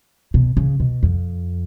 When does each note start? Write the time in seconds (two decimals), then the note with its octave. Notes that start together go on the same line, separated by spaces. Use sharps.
0.34 B2
0.57 C#3
0.80 B2
1.03 F2